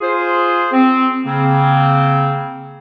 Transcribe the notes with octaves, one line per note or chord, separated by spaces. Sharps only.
F4 G#4 C5
C4
C#3 A#3 C4